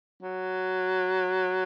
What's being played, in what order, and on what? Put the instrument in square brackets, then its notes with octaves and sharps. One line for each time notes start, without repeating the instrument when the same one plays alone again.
[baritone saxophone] F#3